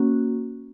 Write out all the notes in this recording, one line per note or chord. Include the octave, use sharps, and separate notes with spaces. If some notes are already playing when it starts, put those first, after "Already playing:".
Already playing: A#3 C#4 F#4